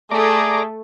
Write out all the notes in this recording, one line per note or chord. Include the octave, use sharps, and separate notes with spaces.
A3 G#4 D5 A#5 D6